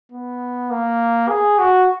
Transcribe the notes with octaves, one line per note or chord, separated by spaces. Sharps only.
B3
A#3
G#4
F#4